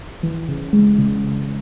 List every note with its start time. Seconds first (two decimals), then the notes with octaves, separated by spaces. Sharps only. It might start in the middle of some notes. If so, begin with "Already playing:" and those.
0.23 E3
0.48 C#3
0.73 G#3
0.98 C#3